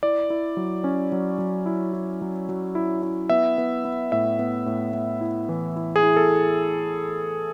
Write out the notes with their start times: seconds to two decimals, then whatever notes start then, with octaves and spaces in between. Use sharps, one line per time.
0.03 E4 D5
0.30 E4
0.57 F#3
0.84 C#4
1.12 F#3
1.39 F#3
1.66 E4
1.93 E4
2.22 F#3
2.49 F#3
2.75 E4
3.03 E4
3.29 B3 E5
3.58 B3
3.85 B3
4.12 A2 E5
4.39 B3
4.66 A2
4.93 B3
5.21 E4
5.49 E3
5.76 E4
5.96 G#4
6.03 E4
6.16 A4